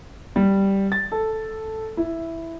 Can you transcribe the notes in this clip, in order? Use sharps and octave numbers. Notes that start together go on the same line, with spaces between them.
G3
A6
A4
E4